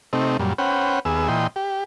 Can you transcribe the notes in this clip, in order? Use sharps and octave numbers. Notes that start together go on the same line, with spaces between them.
C3 A3 C4 D#4
F#2 A#2 G3
C#4 B4 C5 F#5 G5
D#2 B3 G#4 E6
A#2 E3 D#5 G5 C6
G4